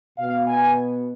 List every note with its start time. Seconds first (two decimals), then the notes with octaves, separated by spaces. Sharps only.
0.18 B2 B3 F5
0.48 G#5